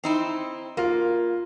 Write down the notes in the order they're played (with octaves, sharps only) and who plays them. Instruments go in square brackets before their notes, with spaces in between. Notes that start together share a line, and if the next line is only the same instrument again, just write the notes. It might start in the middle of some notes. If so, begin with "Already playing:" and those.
[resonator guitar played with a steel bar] C4 D#4 E4
[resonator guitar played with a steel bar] A#3 [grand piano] F4 A#4